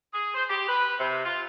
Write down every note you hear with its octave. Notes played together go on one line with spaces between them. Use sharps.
G#4
C5
G4
B4
C3
F4